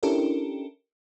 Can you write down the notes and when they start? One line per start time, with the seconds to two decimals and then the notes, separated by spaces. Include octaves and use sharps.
0.03 C#4 D4 E4 G4 A4 A#4